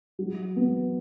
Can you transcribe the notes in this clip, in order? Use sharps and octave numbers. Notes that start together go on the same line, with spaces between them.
F#3
B3